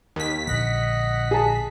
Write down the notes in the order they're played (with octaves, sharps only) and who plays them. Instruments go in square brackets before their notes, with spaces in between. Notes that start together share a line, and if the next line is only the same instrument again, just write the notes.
[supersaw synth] D#2 B6
[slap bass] A#1 D3 [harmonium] D#5 F#5 [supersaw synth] B6
[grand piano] G#4 A5